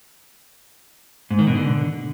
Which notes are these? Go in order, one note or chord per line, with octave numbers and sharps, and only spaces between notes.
G#2
D#3
B2
D3